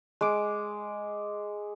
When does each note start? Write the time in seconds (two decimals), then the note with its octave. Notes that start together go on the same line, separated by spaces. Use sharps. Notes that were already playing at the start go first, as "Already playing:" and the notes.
0.21 G#3 D6